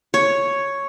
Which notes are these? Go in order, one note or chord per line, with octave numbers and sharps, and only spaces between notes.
C#5